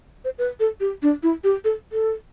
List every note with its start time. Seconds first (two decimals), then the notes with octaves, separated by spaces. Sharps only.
0.25 C5
0.38 B4
0.60 A4
0.80 G4
1.02 D4
1.23 E4
1.44 G4
1.65 A4
1.92 A4